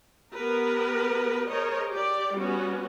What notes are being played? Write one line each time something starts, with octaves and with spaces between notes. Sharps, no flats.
B3 G4 A#4 B4
G#4 A#4 C5 C#5 D#5
G4 D5
G3 B3 C#4 F#4